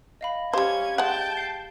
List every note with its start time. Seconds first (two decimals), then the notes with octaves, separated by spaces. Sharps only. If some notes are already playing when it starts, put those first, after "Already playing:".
0.21 D#5 F5 B5
0.53 G3 C#4 G4 C5 F5 G#6
0.98 G#3 F#5 G5 A5 G6
1.37 C7